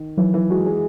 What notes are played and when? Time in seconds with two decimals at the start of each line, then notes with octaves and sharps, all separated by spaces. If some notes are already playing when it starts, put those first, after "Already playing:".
Already playing: D#3
0.17 E3 F#3
0.34 E3
0.50 G#3 F#4
0.66 G#3